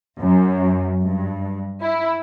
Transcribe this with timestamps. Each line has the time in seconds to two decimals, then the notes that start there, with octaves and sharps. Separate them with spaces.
0.20 F#2
1.02 G2
1.82 E4